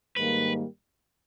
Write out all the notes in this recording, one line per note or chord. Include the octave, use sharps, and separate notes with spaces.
G#2 D#3 G3 A#3 B4